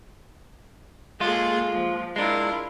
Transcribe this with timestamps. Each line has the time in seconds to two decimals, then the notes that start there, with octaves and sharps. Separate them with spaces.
1.20 G#3 A#3 F4 G#4 A4
1.69 F3
2.16 G#3 D4 E4 F4 A#4